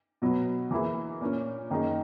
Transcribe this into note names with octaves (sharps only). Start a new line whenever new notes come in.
B2 F#3 B3
E3 A#3 E4 G#4
A#2 A#3 C#4
F#2 D#3 A#3 D#4 G#4